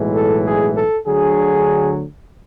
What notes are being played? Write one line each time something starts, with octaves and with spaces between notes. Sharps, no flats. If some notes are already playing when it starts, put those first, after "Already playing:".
Already playing: B1 A2 E3 G#3
A4
G#4
A4
D2 D3 F#3 G#4